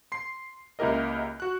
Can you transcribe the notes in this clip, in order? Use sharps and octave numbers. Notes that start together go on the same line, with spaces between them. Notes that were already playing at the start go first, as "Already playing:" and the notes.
C6 C7
C#2 A#3 E4 G4 A#4 D#5
F#4 F#6